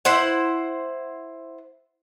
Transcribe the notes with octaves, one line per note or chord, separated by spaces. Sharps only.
E4 C5 F#5